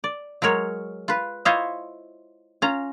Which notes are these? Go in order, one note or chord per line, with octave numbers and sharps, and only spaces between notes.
D5
F#3 G#3 A#4 C#5
F4 B4
E4 F4 C5 C#5 D#5 E5
C#4 F4 A#5